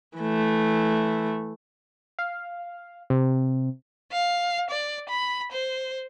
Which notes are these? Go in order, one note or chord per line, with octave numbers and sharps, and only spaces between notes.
E3 A3
F5
C3
F5
D5
B5
C5